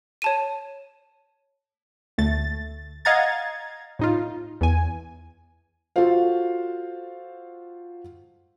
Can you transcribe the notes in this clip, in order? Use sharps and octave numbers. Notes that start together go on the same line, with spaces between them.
C#5 A5 D#7
D2 A3 A6
D#5 F5 F#5 A#5 G#6 A6
A2 D#4 F4
E2 G#5
F4 F#4 A4 C5 F5